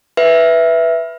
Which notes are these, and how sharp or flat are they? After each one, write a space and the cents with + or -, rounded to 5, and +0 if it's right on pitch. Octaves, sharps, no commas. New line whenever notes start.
B4 +0 E5 +0